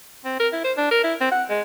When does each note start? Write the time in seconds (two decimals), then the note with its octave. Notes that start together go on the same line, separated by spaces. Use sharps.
0.25 C4
0.40 A#4
0.53 E4
0.64 C5
0.77 D4
0.91 A#4
1.04 E4
1.21 C4
1.32 F#5
1.50 G#3